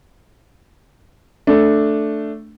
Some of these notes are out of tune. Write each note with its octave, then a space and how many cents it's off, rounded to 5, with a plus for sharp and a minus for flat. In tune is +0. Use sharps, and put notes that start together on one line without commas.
A3 +0 D4 +0